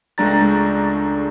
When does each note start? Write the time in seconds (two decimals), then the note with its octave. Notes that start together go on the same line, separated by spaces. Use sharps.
0.18 C#2 G#3 A3 D4 A#5 A6